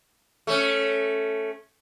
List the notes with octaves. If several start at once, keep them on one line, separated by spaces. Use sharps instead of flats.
A3 C#4